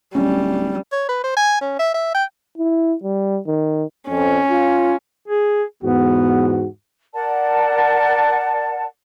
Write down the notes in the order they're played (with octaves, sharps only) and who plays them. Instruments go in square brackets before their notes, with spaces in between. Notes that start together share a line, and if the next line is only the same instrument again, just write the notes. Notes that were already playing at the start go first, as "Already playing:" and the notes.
[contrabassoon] D1 [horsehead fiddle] G3 [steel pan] C#4
[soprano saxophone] C#5
B4
C5
G#5
C#4
E5
E5
G5
[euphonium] E4
G3
D#3
[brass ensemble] F2 [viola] C#4
[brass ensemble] F4
[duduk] G#4
[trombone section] E2 G#2 F#4 [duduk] B3
[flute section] A#4 D5 F#5 A5